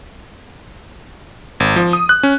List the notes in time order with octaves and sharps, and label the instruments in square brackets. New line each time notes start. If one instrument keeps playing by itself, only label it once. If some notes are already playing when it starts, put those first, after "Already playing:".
[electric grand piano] G#1
F3
D#6
F#6
C#4